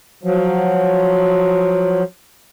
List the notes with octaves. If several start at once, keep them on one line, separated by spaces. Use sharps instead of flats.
F3 F#3